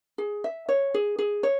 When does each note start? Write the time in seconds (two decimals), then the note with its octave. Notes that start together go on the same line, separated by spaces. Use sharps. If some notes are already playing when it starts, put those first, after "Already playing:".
0.18 G#4
0.44 E5
0.69 C#5
0.94 G#4
1.19 G#4
1.43 C#5